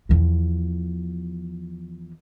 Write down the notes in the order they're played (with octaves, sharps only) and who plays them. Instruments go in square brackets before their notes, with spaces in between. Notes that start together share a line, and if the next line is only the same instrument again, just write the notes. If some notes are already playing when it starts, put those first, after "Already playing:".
[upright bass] E2 F3